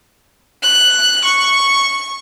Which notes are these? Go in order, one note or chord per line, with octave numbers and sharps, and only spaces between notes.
F#6
C#6